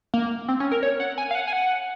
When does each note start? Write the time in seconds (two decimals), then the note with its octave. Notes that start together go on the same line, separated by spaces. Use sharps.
0.14 A#3
0.48 C4
0.60 C#4
0.72 A#4
0.83 C#5
1.00 F#5
1.18 G#5
1.31 F5
1.35 F#5
1.47 G#5
1.53 F#5